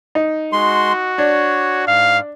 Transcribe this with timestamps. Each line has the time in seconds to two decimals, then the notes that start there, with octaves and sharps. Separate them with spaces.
0.15 D#4
0.52 G#3 F#4 C6
1.18 D4 C#5
1.88 G#2 F5